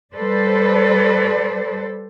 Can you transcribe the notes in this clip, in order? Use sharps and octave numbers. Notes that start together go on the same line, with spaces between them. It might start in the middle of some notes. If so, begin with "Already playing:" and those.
G3 A4 B4 C5 D5